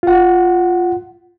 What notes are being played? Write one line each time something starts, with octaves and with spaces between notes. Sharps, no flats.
F4 F#5